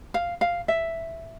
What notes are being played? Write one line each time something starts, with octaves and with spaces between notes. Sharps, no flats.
F5
F5
E5